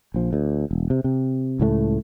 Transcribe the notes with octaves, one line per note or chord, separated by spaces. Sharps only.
A#1 F3
D2
E1
C3
C3
C#2 A2 F#3 A3